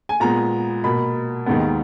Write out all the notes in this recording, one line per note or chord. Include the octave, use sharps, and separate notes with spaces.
G#5
A#2 G#3 B3 A#5
B2 A#3 B5
D#2 D#3 G#3 B3